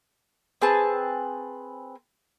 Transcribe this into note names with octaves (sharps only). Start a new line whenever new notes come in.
C4 G#4 B4 A5